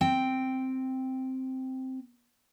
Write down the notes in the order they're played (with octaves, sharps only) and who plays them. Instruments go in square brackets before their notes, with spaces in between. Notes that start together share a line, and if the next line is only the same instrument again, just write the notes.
[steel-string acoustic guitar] C4 G5